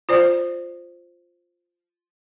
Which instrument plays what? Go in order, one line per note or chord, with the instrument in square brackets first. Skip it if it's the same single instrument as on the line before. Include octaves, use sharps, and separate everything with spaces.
[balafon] F4 C5 D5